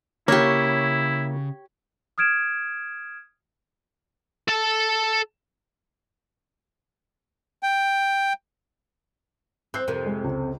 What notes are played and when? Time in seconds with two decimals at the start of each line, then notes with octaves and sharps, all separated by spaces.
0.28 C#3 A#3 E4 G4 C#5
2.18 D#6 F6 G#6 D7 E7
4.48 A4 A5
7.63 G5
9.74 C4 F#6 G6 C7
9.88 F2 C3 A#4
10.06 G#3
10.24 C#2